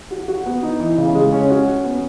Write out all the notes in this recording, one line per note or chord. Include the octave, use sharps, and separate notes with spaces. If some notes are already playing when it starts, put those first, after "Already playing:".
F#4
F#4
B3
D#4
E3
C#3
G#3
C#4
F#4
C#4
B3